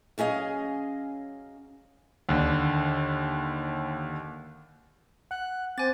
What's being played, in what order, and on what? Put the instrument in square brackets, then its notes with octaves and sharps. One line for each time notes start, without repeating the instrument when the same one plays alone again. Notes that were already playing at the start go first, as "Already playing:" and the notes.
[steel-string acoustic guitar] F#3 C#4 G#4 D#5 F5
[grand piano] D#2 D3
[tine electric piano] F#5 [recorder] F#6
[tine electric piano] C4 [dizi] C5 [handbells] G#5 A6 [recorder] D6